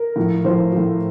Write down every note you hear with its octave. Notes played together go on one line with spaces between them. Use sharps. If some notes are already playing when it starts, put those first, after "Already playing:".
Already playing: A#4
A2 F3
A2 F3 C5
A2 F3